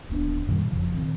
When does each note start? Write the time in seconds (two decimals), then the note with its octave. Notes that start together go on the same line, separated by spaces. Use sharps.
0.09 D1 D#2 B3 D4
0.47 F#2 A#2 D#3 G3
0.70 F#1 F2 C#3 F3
0.94 A#2 D#3 C4